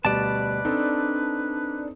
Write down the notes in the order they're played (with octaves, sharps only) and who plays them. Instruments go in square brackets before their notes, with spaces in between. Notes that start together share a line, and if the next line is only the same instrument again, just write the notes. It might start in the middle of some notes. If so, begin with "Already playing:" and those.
[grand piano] D2 B2 G3 [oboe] B4 [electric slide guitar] D5 A5
[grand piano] C4 D#4 A4 [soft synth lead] D4